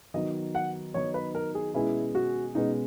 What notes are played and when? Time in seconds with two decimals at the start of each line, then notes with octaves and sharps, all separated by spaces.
0.14 D#3 F#3 B3 D#4 D#5
0.55 F#5
0.94 D#3 F#3 B3 D#4 C#5
1.14 B4
1.35 A#4
1.55 G#4
1.74 B2 G#3 C#4 E4 G#4 B4
2.15 F#4
2.55 B2 G#3 C#4 D#4 G#4 B4